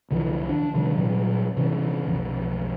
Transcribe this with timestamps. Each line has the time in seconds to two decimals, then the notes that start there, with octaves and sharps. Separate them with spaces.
0.11 C2 D3 E3 F3
0.49 D4
0.75 C3 D#3 F3 G3
0.94 A#2 F#3 G3
1.57 C3 E3 C#4
2.07 B1 F2